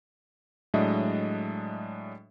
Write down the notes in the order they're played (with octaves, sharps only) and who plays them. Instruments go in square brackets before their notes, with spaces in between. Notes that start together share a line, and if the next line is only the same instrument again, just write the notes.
[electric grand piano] A2 F#3 G#3 D4 D#5 E5